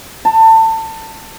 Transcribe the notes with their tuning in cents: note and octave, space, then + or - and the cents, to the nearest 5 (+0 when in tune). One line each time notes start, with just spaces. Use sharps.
A5 +25